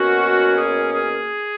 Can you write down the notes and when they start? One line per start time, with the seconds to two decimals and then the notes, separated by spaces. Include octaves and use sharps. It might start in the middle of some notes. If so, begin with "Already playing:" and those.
Already playing: B2 A#3 C#4 F#4
0.56 G#4
0.92 G#4